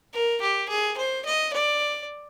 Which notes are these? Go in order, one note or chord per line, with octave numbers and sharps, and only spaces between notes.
A#4
G4
G#4
C5
D#5
D5